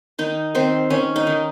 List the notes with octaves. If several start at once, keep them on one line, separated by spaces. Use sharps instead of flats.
D#3 D#4
D#3 C4
D#3 C#4
D#4
D#3